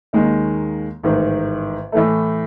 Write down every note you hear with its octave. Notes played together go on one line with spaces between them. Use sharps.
D#2 D#3 G#3 C#4
A1 G#2 D#3
A2 E3 A3